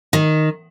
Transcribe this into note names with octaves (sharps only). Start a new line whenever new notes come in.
D#3